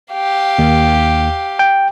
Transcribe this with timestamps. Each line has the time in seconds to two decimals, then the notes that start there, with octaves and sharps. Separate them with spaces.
0.13 G4 F5
0.59 D#2
1.59 G5